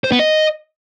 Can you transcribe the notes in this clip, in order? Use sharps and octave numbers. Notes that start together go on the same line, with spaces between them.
C5
B3
D#5